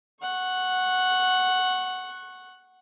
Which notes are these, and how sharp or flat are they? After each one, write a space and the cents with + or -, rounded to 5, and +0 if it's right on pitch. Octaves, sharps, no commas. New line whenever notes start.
F#5 +0 C#6 -20